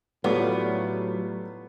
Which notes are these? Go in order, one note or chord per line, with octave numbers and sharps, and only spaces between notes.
A2 F#3 G3 A3 B3 F4 C#5 D5